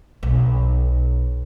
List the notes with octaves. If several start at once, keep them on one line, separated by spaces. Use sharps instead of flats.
B1